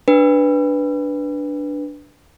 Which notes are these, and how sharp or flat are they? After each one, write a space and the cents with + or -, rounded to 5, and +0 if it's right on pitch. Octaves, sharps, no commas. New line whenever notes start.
D4 +0 B4 +0